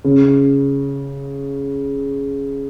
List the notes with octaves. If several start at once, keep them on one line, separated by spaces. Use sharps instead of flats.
C#3